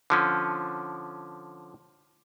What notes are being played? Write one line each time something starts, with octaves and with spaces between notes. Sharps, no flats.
D3 F3 C#4